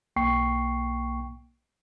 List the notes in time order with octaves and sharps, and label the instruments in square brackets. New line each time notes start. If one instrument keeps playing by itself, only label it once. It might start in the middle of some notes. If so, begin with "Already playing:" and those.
[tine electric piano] B1 A#3 G5 C#6 C7